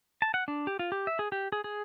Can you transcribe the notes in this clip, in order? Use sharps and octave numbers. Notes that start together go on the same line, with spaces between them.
A5
F#5
D4
G4
F4
G4
E5
G#4
G4
G#4
G#4